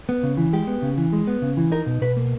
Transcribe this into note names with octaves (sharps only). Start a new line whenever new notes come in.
B3
C#3
E3
G#3 G4
B3
C#3
E3
G#3
B3
C#3
E3
D#4 A#4
B2
B2 B4
A#3